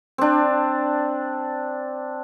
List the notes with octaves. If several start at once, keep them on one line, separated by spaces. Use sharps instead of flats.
C4 D4